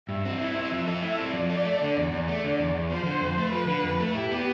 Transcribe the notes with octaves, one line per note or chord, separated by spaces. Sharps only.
G2 E5
C4
E4 E5
C4
F3
A4
E4 E5
C4
F3 D5
A4
A3
D3
E2
E2
A3 D5
D3
E2
E2
F3 C5
D3
F2
A3
F3 B4
D3
F2
A3
E4 G4
B3